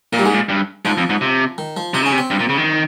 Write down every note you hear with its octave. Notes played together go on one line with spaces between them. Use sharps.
A#2 A#3
G3
G#2 G#3
A#2
G2
G#2 F3
F2
G#2
C3
D#3
F3
C3 D#4
C#3 C#4
C3
C4
G2
A#2
C#3
D#3